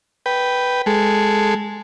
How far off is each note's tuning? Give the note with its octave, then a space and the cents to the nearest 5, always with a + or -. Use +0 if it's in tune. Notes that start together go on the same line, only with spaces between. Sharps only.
B4 +0 G5 -5
G#3 +0 A4 +0